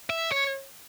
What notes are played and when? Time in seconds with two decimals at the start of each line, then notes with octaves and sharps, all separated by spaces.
0.10 E5
0.32 C#5